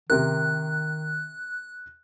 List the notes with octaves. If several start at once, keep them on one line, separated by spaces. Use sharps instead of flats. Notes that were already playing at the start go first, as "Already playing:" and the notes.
C3 D#3 A#4 F#6